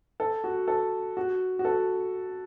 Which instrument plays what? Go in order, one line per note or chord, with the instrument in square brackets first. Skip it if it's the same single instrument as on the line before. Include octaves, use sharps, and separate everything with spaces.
[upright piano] A4
F#4
A4
F#4
F#4
A4